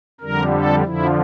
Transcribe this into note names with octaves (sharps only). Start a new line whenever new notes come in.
F2 D3 G3 A#4
A4
F2 D3 F3 E4